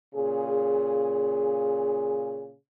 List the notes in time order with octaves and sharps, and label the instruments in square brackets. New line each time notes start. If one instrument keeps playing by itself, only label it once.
[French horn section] A#2 C#3 G#4